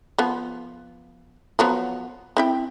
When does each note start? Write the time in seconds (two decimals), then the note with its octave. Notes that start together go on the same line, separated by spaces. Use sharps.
0.18 F3 B3
1.59 F3 F#3 B3
2.37 C4 E4 G5